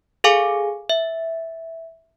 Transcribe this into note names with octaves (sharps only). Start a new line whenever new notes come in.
G#4 A4 F5 G#5 D6
E5